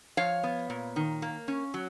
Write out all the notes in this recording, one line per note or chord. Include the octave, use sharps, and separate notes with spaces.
F3 C#5 F5
B3
A#2
D#3
A#3
C#4
F#3